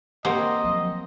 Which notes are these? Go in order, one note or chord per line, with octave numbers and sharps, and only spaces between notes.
A#3 C4 G4 C#5 D#5 F#5
F3 F#3